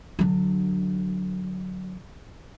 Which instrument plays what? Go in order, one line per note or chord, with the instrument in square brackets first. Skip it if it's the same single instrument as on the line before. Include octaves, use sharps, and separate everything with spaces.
[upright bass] D3 F#3